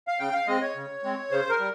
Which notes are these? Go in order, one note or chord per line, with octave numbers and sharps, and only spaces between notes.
F5
C#3 G5
F5
G#3 C4 D#5
C#5
C#3
G#3 C4
C#3 C5
A#4
G3